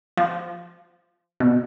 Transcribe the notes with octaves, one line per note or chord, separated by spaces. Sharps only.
F3
B2